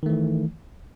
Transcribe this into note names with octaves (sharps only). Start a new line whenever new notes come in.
D#3 E3 A3